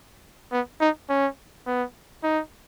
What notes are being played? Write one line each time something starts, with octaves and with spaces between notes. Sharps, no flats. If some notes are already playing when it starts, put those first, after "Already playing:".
B3
D#4
C#4
B3
D#4